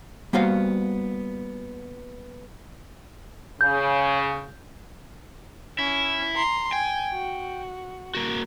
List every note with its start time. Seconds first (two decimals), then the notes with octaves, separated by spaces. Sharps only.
0.33 G3 A#3 B3 F#4 C5 F5
3.61 C#3 G6
5.79 C#4 E4
6.36 A#5 C6
6.72 G5 G#5
7.13 F#4
8.15 A#3 F#4